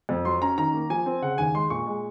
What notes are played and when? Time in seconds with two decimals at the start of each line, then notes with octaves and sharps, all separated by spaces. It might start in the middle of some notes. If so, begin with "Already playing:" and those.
0.09 F2
0.25 F#3 C6
0.42 C#4 A#5
0.58 D#3 A#5
0.73 A#3
0.90 F3 G#5
1.06 C4
1.22 C#3 F#5
1.38 D#2 G#5
1.54 G#3 C6
1.70 A#2 C#6
1.86 G#3